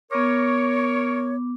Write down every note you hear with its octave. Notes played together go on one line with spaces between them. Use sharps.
B3 A#4 C#5 D6